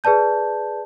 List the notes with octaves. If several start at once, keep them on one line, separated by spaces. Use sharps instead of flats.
G#4 B4 D5 A5 G6